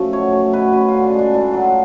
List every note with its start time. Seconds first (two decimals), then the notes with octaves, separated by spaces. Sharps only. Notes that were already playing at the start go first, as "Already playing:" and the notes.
Already playing: F#2 F3 A3
0.13 B2 C#5
0.33 A3
0.53 B2 B4
0.73 F#2 B4
0.88 D3 F4
1.04 D4
1.14 G#3 D4
1.34 A2 D4
1.54 F#3
1.64 F4